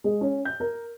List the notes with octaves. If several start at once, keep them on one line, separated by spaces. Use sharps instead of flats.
G#3
C#4
G6
A#4